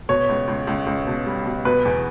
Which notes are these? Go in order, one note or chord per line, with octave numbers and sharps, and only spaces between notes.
B2 C#5
C#2
C#2
C#2
C#2
B2
G3
B2
B2 B4
E2